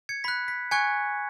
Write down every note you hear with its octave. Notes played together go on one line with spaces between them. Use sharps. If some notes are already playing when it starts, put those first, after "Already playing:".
G#6 C#7
B5 F#6 B6
B6
G#5 C#6 F#6 G#6 C#7